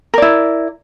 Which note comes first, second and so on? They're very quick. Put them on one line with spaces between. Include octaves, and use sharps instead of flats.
A#4 D5 E4